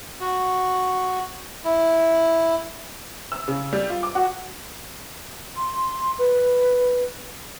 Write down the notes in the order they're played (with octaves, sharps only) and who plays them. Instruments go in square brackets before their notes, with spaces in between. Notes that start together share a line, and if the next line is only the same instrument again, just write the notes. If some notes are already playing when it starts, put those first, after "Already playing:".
[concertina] F#4
E4
[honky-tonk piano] E6
C#3
G3
F4
D6
F#4
[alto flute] C6
B4